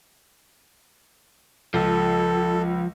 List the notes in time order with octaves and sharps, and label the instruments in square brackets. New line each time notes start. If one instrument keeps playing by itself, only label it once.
[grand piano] C#2 [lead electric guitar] F3 [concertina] A4